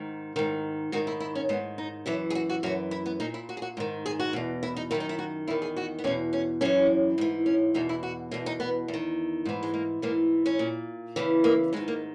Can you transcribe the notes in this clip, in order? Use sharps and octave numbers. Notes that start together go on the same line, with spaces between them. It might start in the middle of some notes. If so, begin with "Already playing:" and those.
Already playing: G#2 D#3
G#2 D#3
G#2 D#3 F#4
E4
E4
C#4
G#2 D#3 B3
D#4
F#2 E3 E4
G#4
F#4
F#4
F#2 E3 F#4
E4
B3
A#2 D#4
E4
F#4
G#4
F#4
G#2 D#3
G#4
F#4
E2 B2
E4
D#4
F#2 D#3 E4
D#4
E4
F#4
E2 D#3 E4
G#4
F#4
B3
E2 B2 C#4
C#4
F#2 E3 C#4
G#2 E3
C#4
E2 B2 D#4
E4
F#4
E2 B2 E4
D#4
B3
E2
D#3
G#2 E3
G#3
A#3
G#2 E3 A#3
C#4
A#2
E2 C#3 E3
A#3
G#2 D#3 G#3
A#3